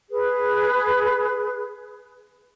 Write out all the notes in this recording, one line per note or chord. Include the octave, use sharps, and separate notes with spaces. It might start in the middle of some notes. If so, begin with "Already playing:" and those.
G#4 B4